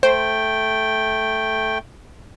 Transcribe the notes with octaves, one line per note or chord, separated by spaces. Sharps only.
A3 C5 G5